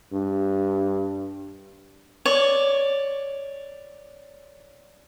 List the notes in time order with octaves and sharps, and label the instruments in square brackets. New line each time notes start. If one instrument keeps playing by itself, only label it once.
[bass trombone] G2
[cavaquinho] C#5 D5